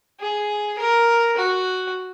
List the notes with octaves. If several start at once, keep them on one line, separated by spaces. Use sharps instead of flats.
G#4
A#4
F#4